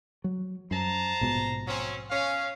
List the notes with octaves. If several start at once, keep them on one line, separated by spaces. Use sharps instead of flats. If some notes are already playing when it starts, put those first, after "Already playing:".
F#3
F#2 C5 A5 A#5
A#1 G#2 B2
F#3 C4 C#4
C#4 F5